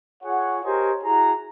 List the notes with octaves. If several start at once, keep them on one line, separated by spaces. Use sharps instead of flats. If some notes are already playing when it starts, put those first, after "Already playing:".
F4 G#4 C#5 F#5
G4 A#4 C5 C#5 D#5 G#5
E4 F#4 G#4 A#5